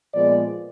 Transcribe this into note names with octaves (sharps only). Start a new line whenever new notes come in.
A#2 F3 G#3 B3 D5